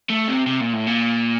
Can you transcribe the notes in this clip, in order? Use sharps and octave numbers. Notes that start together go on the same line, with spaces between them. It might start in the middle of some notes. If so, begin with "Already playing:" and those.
A3
C3
C3
A#2
A2
A#2